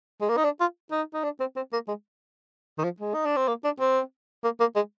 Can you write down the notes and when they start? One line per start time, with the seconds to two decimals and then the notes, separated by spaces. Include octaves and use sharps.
0.21 G#3
0.29 A#3
0.37 D#4
0.44 D4
0.60 F4
0.92 D#4
1.14 D#4
1.24 D4
1.40 C4
1.56 C4
1.73 A#3
1.88 G#3
2.78 D#3
2.84 F3
3.00 G#3
3.14 D#4
3.25 D4
3.36 C4
3.48 A#3
3.64 D4
3.80 C4
4.44 A#3
4.60 A#3
4.75 G#3